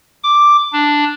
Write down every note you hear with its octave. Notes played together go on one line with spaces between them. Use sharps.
D6
D4